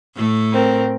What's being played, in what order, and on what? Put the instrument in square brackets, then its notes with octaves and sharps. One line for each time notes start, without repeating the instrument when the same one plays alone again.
[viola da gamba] A2 A3
[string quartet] C4 A#4